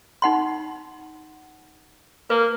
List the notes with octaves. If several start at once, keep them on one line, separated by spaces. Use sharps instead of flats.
D#4 F#5 C6
A#3 B4